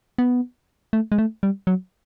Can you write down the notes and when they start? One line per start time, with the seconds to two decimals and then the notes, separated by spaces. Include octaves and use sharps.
0.18 B3
0.93 A3
1.12 G#3
1.18 A3
1.43 G3
1.67 F#3